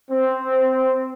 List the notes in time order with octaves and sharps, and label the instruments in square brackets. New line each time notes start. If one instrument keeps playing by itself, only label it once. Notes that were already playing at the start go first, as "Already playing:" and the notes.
[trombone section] C4